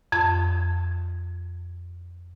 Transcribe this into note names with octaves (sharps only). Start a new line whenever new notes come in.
F2 G#6